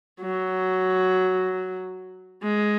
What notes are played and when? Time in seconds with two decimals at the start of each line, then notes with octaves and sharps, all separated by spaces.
0.21 F#3
2.43 G#3